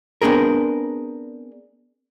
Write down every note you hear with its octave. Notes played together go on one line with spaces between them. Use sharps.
B3 C4 D4 G#4 A#4